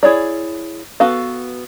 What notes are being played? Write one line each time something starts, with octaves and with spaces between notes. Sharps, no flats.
E4 G#4 C#5 D5
B3 F#4 A4 F5